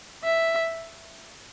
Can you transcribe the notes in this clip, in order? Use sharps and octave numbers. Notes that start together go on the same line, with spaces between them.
E5